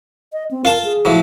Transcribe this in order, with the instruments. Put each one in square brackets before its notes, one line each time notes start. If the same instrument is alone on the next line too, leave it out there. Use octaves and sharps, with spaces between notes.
[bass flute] D#5
C4
[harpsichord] F4 F5 A5 [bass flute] A#4
[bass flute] G#4
[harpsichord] A2 F3 F#3